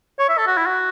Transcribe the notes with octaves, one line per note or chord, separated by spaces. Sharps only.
C#5
E5
A4
F#4
E4
F#4